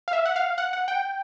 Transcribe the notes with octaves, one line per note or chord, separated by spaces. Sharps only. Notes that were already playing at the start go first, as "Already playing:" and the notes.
F5
E5
F#5
F5
F#5
F#5
G5